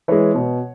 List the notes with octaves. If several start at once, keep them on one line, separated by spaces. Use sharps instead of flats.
E3 G#3 C#5
B2